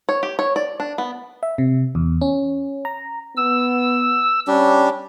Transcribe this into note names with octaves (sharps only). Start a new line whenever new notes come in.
C#5
G4
C#5
D5
D4
B3
E5
C3
E2
C#4
A#5
B3 E6
G3 C#4 D4 G4